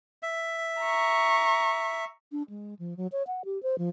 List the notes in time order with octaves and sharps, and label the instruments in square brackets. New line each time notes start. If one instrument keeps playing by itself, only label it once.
[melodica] E5
[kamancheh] A#5 C#6
[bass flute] D4
G#3
F3
F#3
C#5
F#5
G4
C5
F3